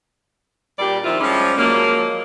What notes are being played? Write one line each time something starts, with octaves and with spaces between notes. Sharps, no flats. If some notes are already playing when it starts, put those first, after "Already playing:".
A#2 G3 D4 G4 D5
D#3 F3 C4 E4 F4
F3 G3 G#3 C#4
F3 F#3 G#3 A#3